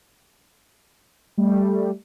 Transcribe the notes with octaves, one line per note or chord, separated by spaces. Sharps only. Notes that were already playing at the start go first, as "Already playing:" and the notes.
G3 A3